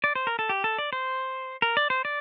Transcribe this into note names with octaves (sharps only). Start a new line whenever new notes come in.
D5
C5
A#4
A4
G4
A4
D5
C5
A#4
D5
C5
D5